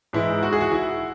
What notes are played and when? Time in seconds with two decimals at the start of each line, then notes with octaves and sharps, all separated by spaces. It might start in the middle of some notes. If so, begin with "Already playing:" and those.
0.13 G#2 E3 G#3 E4
0.43 F#4
0.53 G#4
0.61 F#4
0.72 E4